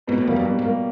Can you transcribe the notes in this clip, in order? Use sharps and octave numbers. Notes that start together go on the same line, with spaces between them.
G#2 B2
A2
E2 G3 A#3
F2
G2 B2
G#2
G3 A#3